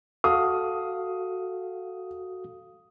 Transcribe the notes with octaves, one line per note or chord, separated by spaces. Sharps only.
F#4 A4 F5 D#6